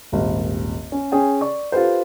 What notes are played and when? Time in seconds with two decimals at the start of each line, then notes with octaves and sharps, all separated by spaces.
0.12 D#1 G#1 D#2
0.92 C#4
1.12 C#4 G#4 G5
1.41 D5 C#6
1.72 F4 G4 A4 B4 C5